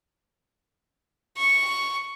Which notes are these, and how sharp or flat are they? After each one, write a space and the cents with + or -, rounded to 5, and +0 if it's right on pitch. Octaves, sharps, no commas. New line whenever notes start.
C#6 +0